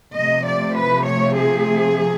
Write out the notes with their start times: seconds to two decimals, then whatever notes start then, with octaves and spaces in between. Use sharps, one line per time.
0.14 C3 F3 A3 D#5
0.46 D5
0.76 B4
1.06 C#5
1.36 G#4